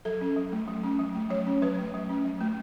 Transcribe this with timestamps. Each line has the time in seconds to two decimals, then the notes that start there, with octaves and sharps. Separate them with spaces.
0.05 F#3 A4
0.21 C#4
0.37 F#3
0.52 A3
0.68 F#3
0.83 C#4
0.99 F#3
1.15 A3
1.30 F#3 C#5
1.47 C#4
1.62 F#3 B4
1.78 A3
1.94 F#3
2.09 C#4
2.25 F#3
2.41 A3